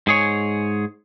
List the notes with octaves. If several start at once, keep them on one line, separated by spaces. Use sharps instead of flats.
G#2 G#4 C#5